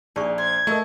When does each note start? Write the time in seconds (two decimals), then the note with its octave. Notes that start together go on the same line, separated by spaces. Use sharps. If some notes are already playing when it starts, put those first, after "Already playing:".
0.16 A#1 D#4 G#4 D5 C#6
0.38 C5 G#6
0.67 A3 E4 A4 A#4 D#5